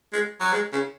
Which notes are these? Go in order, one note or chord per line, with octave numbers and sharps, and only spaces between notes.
G#3
F#3
G#3
C#3